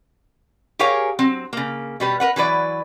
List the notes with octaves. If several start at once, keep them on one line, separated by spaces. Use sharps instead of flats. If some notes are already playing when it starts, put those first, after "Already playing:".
G4 G#4 A#4 C#5 F5 G#5
F#3 C4
C#3 A#3
B2 G3 B4
A#4 B4 F#5
E3 F#3 B4 D5